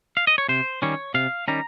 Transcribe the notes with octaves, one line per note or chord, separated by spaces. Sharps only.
F5
D#5
C#5
C3 C5
D#3 G3 C#4 C#5
C3 F5
D#3 G3 C#4 A#5